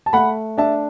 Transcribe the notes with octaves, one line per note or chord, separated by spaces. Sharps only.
A5
A3 F#5 B5
D4 E5 A5